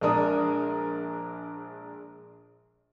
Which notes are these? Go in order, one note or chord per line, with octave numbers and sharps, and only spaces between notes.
A#1 G#3 D4 A#4 D#6